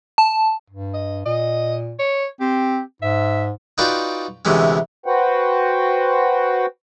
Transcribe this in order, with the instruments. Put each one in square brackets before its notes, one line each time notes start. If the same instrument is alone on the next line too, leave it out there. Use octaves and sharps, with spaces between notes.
[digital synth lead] A5
[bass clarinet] G2
[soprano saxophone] D#5
[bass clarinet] A#2 [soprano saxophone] D#5
[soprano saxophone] C#5
[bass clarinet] C4 [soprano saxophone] G4
[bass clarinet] G#2 [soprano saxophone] E5
[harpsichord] D#4 F4 F#4 B4 D5 G5
D2 C3 E3 G#3 C#4
[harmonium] F#4 B4 C5 F#5 G5